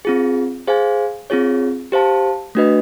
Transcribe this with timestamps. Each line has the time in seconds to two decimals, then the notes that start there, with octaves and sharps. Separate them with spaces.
0.05 C4 F4 G#4
0.67 G#4 C5 F5 G#5
1.30 C4 F4 G#4 C#5
1.92 G4 C5 F5 A5
2.55 A3 D4 F#4 B4 D#5